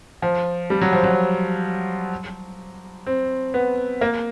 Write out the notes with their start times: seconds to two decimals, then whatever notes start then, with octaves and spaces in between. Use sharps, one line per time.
0.22 F3
0.70 G3
0.81 F#3
0.93 F3
1.04 F#3
3.06 C4
3.54 B3
4.01 A#3